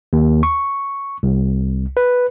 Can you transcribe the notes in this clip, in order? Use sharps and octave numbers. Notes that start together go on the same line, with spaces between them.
D#2
C#6
C2
B4